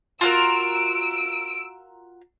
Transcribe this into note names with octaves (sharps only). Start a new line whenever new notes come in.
F4 F#4 A#4 E6 D7